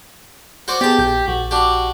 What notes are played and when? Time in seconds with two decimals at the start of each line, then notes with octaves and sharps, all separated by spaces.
0.68 F#4 C5 D5
0.81 B3 G4 G#4 D5 A5
0.99 A#1 G6
1.27 A#1 F#4
1.51 D4 F#4 G4